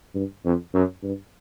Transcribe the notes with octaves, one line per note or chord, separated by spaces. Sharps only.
G2
F2
F#2
G2